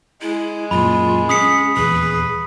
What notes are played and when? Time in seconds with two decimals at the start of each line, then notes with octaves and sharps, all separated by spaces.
0.22 G#3 E4
0.71 F#2 A#2 F4 B5
1.29 C#4 G#4 D#6 B6 C#7
1.77 D#1 E2 G#4 B4